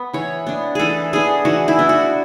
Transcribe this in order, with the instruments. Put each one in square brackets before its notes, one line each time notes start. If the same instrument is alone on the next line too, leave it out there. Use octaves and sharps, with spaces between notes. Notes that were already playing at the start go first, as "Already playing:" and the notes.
Already playing: [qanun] B3
E3 C#5
B3 D4
E3 G#4 A4
B3 D4 G#4
E3 F#4
E4
B3 D4
F#4